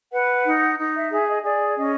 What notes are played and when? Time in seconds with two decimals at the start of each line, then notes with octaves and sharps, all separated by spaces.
0.12 B4 F#5
0.45 D#4
0.79 D#4
0.95 E5
1.11 G#4 E5
1.27 D#5
1.43 G#4 D5
1.77 C#4 D#5